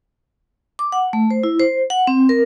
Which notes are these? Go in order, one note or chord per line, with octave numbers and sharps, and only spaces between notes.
D6
F#5
A3
C5
E4
C5
F#5
C4
A#4